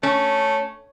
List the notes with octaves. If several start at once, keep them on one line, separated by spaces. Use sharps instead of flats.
A3 C#4